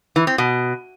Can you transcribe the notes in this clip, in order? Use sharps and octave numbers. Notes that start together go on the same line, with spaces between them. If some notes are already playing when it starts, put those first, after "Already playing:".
E3
C4
B2